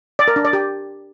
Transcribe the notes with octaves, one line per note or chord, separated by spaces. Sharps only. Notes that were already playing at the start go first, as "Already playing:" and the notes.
D5
A#4
D4
D5
G4